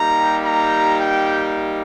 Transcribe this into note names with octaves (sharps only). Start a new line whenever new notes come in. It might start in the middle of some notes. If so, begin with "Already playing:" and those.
Already playing: G3 A#3 D#4 G4 A#5
A#5
G5